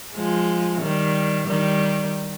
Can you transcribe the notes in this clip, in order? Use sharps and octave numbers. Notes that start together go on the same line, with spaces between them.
F3 G#3
D#3 G3
D#3 G3